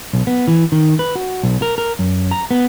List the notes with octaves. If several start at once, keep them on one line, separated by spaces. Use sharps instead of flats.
B1
B3
E3
D#3
B4
F#4
B1
A#4
A#4
F#2
A#5
B3